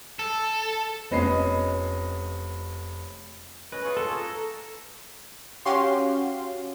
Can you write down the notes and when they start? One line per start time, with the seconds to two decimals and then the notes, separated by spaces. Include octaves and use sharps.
0.19 A4
1.11 F1 B3 C#4 D#5 B5 C7
3.72 C#4 B4 D#5 D#6
3.85 F4 G#4 C#6
3.97 A4
4.17 A4 A#5
5.65 C#4 F#4 G4 F5 C6